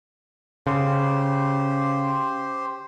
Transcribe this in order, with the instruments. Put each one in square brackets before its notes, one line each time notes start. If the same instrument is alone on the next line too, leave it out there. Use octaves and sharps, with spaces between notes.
[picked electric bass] C#3 [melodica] G4 C5